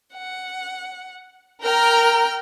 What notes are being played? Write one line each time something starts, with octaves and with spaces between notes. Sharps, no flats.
F#5
A#4 G5 F6